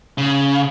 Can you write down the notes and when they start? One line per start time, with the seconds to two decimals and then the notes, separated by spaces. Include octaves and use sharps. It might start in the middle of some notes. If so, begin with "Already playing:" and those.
0.18 C#3